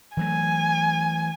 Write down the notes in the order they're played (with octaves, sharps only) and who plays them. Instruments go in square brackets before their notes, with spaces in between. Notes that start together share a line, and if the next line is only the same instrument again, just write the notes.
[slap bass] E3 F#3 A3 [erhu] G#5